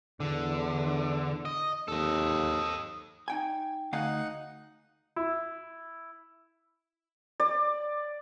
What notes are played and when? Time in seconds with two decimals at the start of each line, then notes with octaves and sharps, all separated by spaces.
0.20 E2 D3
1.45 D#5
1.88 D#2 A4 D#5
3.28 D#4 G5 G#5
3.93 D2 D#4 F5 F#5 G#5
5.16 E4
7.40 D5